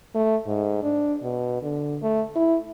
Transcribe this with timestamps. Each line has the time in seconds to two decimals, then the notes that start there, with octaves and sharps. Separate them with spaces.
0.15 A3
0.47 G#2
0.83 D4
1.23 B2
1.63 D3
2.02 A3
2.36 E4